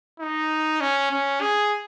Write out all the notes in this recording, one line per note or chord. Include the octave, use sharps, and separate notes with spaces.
D#4
C#4
C#4
G#4